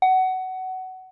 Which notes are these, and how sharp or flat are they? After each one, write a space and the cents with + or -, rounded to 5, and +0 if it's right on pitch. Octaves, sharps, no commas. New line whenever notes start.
F#5 +20